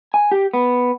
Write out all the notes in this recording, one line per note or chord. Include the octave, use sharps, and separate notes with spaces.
G#5
G4
B3